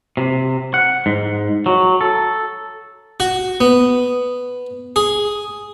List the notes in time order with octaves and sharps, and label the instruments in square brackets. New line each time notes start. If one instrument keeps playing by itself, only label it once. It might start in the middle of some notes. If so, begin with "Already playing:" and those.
[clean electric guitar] C3
F#5
G#2
F#3
A4
[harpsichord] F#4
B3
G#4